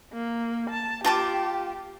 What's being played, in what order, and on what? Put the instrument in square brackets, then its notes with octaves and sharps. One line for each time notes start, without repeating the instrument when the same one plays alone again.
[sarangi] A#3
A5
[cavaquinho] F4 A5 D6 [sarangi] G4